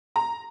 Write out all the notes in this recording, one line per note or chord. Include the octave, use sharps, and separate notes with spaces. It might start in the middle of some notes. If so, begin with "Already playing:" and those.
A#5